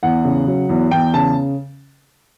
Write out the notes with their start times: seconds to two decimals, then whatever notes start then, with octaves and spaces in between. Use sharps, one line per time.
0.03 E2 F#5
0.24 C#3
0.47 F#3
0.69 E2
0.91 E2 G5
1.14 C#3 A5